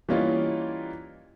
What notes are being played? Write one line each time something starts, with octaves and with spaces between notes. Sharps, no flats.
E3 G3 A#3 C#4 D#4 F4